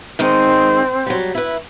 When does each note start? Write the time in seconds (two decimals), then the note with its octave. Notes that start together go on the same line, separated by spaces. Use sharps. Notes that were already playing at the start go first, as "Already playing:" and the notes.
0.19 D#3 G#3 C4 D#4
1.06 F#3 G3
1.35 E4 B4